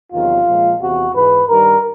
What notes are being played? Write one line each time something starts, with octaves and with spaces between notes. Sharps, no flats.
E2 C3 D#3 F#3 F4
A#2 F3 G#3
E2 C3 E3 F#4
G#2 E3 G#3 B4
G2 D#3 G3 A#4